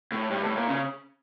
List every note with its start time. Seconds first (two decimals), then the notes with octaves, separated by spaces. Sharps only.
0.12 A2
0.30 G2
0.44 A2
0.56 A#2
0.68 C#3